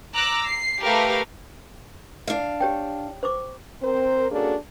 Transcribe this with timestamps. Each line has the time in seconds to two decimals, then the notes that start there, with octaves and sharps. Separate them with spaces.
0.14 A#5 D6 E6 F#6
0.44 C7
0.83 A3 G4 A#4 B4 F5
2.27 D4 F5
2.60 G4 C#5 G5
3.23 C5 C#6 D6
3.82 C4 A#4 C5
4.31 A#3 C#4 D4 F#4 G#4 A4